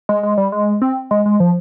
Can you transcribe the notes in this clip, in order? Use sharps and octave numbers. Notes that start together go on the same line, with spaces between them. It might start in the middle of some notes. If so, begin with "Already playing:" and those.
G#3
G#3
G3
G#3
C4
G#3
G#3
F3